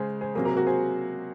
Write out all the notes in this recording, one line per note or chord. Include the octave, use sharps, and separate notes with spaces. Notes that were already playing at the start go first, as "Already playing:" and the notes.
Already playing: C#3 G#3 G#4 C5
G#4 C5
C3 F#3 A#3 G#4 C5
F#4 A#4
F#4 A#4
G#4 C5